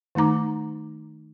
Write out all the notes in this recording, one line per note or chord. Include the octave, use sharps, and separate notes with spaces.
D#3 A3 D#4 A#5 D6